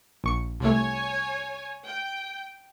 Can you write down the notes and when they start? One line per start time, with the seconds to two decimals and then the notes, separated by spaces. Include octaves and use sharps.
0.24 A#1 C#6 C#7
0.60 C2 A3 C#5 G#5
1.84 G5